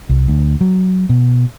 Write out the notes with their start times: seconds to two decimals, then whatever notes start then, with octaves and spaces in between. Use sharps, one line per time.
0.09 C2
0.28 D2
0.61 F#3
1.09 B2